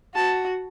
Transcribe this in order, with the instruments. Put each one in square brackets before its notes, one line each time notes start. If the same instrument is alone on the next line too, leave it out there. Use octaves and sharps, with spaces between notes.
[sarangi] F#4 [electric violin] A5